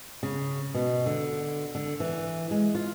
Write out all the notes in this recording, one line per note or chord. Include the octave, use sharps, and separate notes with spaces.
C#3
B2
D3
D3
E3
G#3
F4